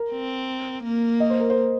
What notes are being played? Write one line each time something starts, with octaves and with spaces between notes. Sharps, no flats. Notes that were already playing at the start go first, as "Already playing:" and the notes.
Already playing: A#4
C4
A#3
D#5
C5
A#4
C5